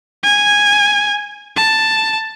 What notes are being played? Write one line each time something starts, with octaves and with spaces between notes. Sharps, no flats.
G#5
A5